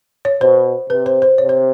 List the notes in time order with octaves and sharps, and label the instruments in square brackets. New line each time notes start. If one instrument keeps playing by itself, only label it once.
[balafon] C#5
[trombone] B2 [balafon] C5
[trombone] C3 [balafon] B4
[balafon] C5
C5
[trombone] C3 [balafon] C#5
[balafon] C5